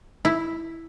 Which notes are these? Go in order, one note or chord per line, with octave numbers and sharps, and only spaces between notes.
E4